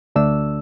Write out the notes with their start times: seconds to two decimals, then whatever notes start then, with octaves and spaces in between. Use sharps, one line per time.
0.15 D2 D3 A3 D4 E6